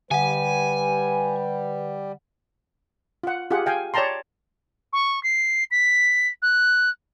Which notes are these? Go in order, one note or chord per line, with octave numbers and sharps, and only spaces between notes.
D3 G3 B4 F#5 G#5
F4 F#5
F4 G4 G#4 F#5
F5 G5 G#5
C#5 D5 G5 A5 A#5 C6
C#6
C7
B6
F#6